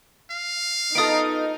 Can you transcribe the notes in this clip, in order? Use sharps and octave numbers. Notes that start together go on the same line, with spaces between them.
F5
B3 D#4 F4 A4 D#6 D7